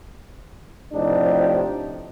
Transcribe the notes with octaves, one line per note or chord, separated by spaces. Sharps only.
A2 C3 F3 D4 D#4 G4